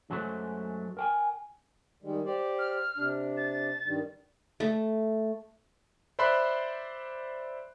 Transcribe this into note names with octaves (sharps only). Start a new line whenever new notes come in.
F#2 F#3 G#3 A3 C5
A#4 G5 G#5
D#3 G3 G#3
G4 C5 D5
F6
C3 D4
A6
G2 D#3 G3
A3
C5 D5 E5 B5 C6 F#6